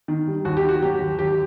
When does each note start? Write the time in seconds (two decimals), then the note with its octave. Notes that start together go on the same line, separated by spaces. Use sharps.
0.08 D#3
0.27 G3
0.45 D#2 F#4
0.57 G4
0.63 D#3
0.69 F#4
0.82 F#3 G4
1.00 D#2
1.18 D#2 G4